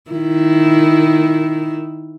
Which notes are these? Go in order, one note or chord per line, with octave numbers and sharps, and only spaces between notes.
D#3 E4